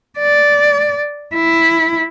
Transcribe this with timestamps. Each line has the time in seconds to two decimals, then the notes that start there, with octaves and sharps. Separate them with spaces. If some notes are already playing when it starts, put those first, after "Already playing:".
0.19 D5
1.35 E4